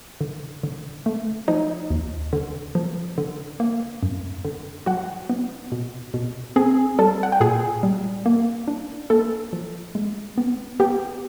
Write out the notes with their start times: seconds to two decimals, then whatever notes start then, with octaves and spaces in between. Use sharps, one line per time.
0.21 D3
0.63 D3
1.06 A3
1.48 F3 D#4 D#5
1.90 D#2
2.33 D3
2.75 F3
3.18 D3
3.60 A#3
4.03 F#2
4.45 D3
4.86 F#3 F#4 F#5
5.30 B3
5.72 B2
6.14 B2
6.56 C4 G#4 G#5
6.99 G3 A4 A5
7.23 F#5
7.32 G5
7.40 A#2 G#4 G#5
7.83 G3
8.26 A#3
8.68 D4
9.10 A#3 A4 A5
9.53 F3
9.95 G#3
10.38 B3
10.80 B3 G4 G5